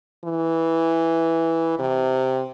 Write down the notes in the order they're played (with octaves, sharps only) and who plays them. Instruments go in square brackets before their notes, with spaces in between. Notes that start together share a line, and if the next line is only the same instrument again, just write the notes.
[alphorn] E3
C3